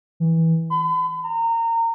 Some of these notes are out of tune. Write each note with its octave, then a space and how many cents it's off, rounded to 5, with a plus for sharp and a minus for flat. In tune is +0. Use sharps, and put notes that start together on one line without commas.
E3 -15
B5 +40
A#5 -25